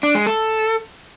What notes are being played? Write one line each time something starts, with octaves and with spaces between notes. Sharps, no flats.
D4
G#3
A4